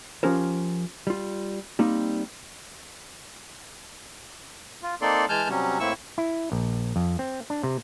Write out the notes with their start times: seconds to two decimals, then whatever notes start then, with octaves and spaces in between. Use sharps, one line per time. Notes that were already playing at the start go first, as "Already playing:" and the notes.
0.23 F3 C#4 G4 A#4 C5
1.07 G3 F4
1.79 G3 A#3 C4 D#4
4.83 F4
5.02 A#3 C4 D#4 A4 D5 C6
5.29 E3 G#3 G#5 A5 F6 G6
5.49 C3 F#3 G3 C#4
5.80 A2 A#3 C4 E4 C#6 E6
6.18 E4
6.52 A#1
6.96 F2
7.19 C4
7.50 D4
7.63 C3